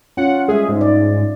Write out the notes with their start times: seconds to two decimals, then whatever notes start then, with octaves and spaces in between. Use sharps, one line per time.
0.17 C#4 F4 F#5
0.48 G3 G#3 G#4 E5
0.69 G#2
0.81 D5